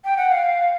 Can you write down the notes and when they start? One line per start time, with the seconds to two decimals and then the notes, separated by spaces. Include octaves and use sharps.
0.04 G5
0.17 F#5
0.29 F5